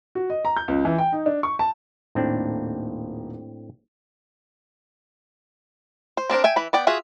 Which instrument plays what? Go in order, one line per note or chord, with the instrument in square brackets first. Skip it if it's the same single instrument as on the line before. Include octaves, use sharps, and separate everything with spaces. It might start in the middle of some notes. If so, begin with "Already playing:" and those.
[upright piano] F#4
D#5
A#5
G6
C#2
E3
G5
D#4
D4
C#6
A5
[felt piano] D#1 A#3 D#4 [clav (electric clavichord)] A2 C4 D4
[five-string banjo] C5
C4 D4 A#4 C5
E5 G5 G#5
E3 B5
B3 D5 G5
F4 F#4 G#4 E5